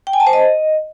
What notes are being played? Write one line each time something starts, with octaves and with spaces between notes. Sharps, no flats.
G5
G#5
A5
C5
D#5